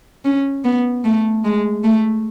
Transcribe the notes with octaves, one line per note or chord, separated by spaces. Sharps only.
C#4
B3
A3
G#3
A3